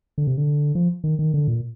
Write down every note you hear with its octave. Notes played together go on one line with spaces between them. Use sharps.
D3
C3
D3
F3
D#3
D#3
D3
A#2